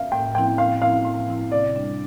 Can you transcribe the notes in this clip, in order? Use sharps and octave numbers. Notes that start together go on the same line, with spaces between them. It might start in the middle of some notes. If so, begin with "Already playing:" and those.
Already playing: E5 F5
A2 G5
F3 C4 E4 G5
A2 F5
F3 C4 E4 F5
A2
F3 C4 E4
C3 D5
G3 D4